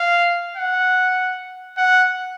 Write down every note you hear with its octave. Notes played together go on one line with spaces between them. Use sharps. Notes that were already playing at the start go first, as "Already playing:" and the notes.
Already playing: F5
F#5
F#5